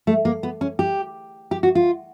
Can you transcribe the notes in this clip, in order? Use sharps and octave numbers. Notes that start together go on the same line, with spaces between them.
A3
A#3
B3
C#4
G4
G4
F#4
F4